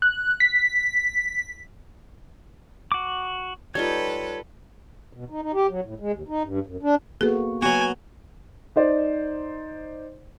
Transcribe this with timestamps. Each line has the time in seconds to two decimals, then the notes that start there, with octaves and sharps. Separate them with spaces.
0.02 F#6
0.40 B6
2.92 F#4 D6
3.75 G3 D#4 F4 A4 B4 C#5
5.13 B2
5.30 D#4
5.42 D#4
5.54 G4
5.69 F#3
5.82 A2
6.00 G#3
6.12 D#2
6.28 D#4
6.43 G2
6.67 F#2
6.83 D4
7.21 A#3 B3 F#4 G#4 A4 B4
7.62 F#3 B3 F#4 G#5
8.76 D#4 C5 D5